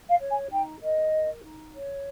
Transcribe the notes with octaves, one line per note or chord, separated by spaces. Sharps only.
F5
C#5
G#5
D#4 G5
A#4 D#5
A#4
D#4
C#5